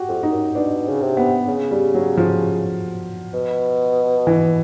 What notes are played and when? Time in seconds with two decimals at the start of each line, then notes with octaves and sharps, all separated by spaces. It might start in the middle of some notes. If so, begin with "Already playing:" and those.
Already playing: F#4 G4
0.09 F2
0.23 D#4
0.31 F#2
0.55 B2 D4
0.89 C#3
1.01 C3
1.17 B3
1.48 C#3
1.71 G3
1.94 F#3
2.17 F3
3.34 B2
4.27 E3